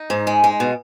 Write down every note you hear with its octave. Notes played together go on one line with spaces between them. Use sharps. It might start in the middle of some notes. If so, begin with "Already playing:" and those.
Already playing: D#4
G#2
G#3
G#3
B2